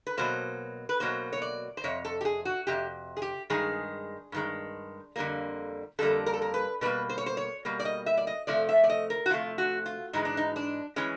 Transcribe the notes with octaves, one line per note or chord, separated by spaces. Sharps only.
B4
B2 F#3 A#3 C5
B4
B2 F#3 A#3 C5
C#5
D5
C5
F2 C3 C#5
A4
G4
G#4
F#4
F2 C3 G4
G#4
G4
G2 D#3 G#3 G#4
G2 D#3 G#3
F2 D3 G3 A#3
F2 D3 G3 A#3 A4
A#4
A4
A#4
B4
B2 G3 A#3 B4
C5
C#5
C5
C#5
B2 G3 A#3
D5
D#5
E5
D5
D#5
C3 F3 A3 D5
E5
D5
D#5
A#4
F#4
C3 F3 A3 F4
F#4
F4
G#2 E3 G#3 D#4
D4
D#4
D4
E3 G#3 C#4